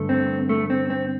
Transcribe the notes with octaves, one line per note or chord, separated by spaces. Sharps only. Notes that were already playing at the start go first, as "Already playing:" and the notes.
Already playing: G2 D3 A3
C4
A3
C4
C4